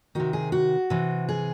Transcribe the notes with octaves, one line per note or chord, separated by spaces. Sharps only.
C3 D#3 F#4
G#4
F#4
C3 E3
G#4